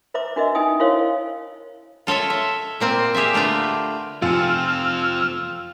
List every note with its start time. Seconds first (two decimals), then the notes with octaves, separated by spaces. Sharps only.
0.14 B4 C5 E5 A#5 D6
0.36 D4 F#4 A#4 B4 D#5 E5
0.55 C#4 D#4 G5 G#5 D#6
0.80 E4 F#4 A#4 C5 C#5 F5
2.07 F4 A4 C#5 D#5 E5
2.30 E5
2.80 A#2 A#3 C4
3.14 G4 G#4 D5 E5
3.33 D3 A3 F4 B4 D5
4.22 F1 F2 C4 F4 G#5 E6 F6 C#7